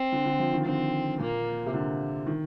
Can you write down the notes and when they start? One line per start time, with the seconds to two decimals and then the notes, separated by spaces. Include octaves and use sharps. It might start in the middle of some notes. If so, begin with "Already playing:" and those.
Already playing: C4
0.12 D3
0.25 D3
0.39 F3
0.53 D#3
0.66 D3 C4
1.19 A#2 A#3
1.66 C3
1.74 D3
2.27 D#3